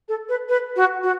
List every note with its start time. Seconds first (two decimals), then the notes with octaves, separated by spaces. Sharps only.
0.09 A4
0.29 B4
0.49 B4
0.76 F#4
1.03 F#4